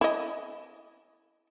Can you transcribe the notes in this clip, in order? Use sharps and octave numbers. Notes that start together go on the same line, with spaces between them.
E4 D#5